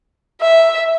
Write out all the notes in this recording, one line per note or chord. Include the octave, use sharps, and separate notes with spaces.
E5